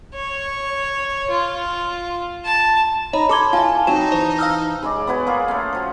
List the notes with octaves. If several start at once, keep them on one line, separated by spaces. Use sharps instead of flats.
C#5
F4
A5
D#4 C#5 D#5 A#5 B5
A4 A5 B5 C6 D6 G#6 G7
E4 F4 F5 G#5 A5
F#3 C4 D#4 G5 A5 E7
E3 C5
F5 E6 F6
C#3 G#3 D5
B3 F#4 B4 G#5
A#3 F4 G#4
A3 C#4
F3 F#4